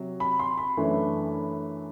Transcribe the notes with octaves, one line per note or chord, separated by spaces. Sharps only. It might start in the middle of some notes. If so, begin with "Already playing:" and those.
Already playing: C3 F#3
B5
C6
B5
F#2 E3 A3 D4